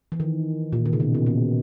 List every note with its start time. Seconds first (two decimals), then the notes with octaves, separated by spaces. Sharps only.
0.12 E3
0.20 D#3
0.73 A#2
0.86 D#3
0.93 C#3
1.00 B2
1.14 B2
1.26 A#2